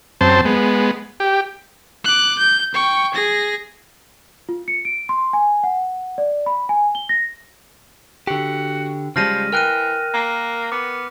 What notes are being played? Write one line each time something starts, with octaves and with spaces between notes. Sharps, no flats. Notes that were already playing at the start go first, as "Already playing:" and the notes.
F#2 C4 C5 A5
G#3 B3
G4
D6 F#6
G6
G5 C#6
G#4 A#6
F4
C#7
D7
C6
G#5
F#5
D5
B5
G#5
G7
A#6
D3 F#4 G4
C#3 F3 G3 G#3 F6 A#6 D#7
E3 A#4 G5 F6 F#6 D#7
A#3
B3 D6